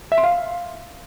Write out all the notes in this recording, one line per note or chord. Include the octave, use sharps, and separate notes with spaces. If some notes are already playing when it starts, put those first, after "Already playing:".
E5
C6
F5